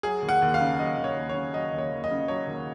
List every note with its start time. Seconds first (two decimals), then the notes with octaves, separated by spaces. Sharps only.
0.03 F#3 G#4
0.22 D#2
0.29 F#5
0.42 D#2
0.54 F5
0.60 C#3
0.78 F#3 D#5
0.97 D#2
1.04 C#5
1.16 D#2
1.29 C#5
1.35 C#3
1.54 F#3 D#5
1.73 D#2
1.78 C#5
1.92 D#2
2.04 D#5
2.11 C#3
2.28 F#3 C#5
2.47 D#2